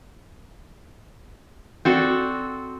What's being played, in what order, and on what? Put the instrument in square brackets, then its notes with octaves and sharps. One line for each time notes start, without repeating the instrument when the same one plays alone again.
[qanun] C4 F#4 A4 D5